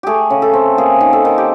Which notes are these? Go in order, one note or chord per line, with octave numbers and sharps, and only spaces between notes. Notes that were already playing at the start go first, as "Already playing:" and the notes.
A3 G4 G#4
C#3
A4
C4
A#3 G#4
D#3
A4
D#3
G4